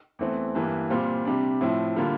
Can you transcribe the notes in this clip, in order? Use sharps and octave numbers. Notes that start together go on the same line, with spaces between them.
E2 E3 A3 C4
G2 E3 A#3
A#2 G3 C4 F4
C3 G3 D4
A2 F3 C4 E4
D3 G3 A#3 F4